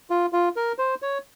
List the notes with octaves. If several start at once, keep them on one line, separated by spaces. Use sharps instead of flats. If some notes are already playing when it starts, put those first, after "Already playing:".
F4
F4
A#4
C5
C#5